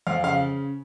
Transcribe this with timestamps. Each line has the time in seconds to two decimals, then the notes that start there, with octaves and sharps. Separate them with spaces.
0.07 F2 F5
0.24 C#3 F5